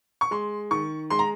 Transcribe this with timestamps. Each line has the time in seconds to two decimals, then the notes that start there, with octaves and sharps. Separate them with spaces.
0.21 C#6
0.31 G#3 C6
0.71 D#3 C#6
1.10 G#3 C6
1.19 A#5